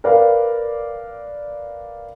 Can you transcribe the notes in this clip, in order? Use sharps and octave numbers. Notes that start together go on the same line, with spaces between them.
A#4 B4 D5 F5